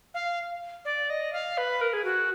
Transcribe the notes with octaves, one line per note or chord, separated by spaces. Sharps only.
F5
D5
D#5
F5
B4
A#4
G#4
F#4